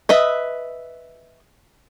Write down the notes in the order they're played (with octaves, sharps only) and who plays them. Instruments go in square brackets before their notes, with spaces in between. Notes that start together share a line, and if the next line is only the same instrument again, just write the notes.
[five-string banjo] B4 D#5 E5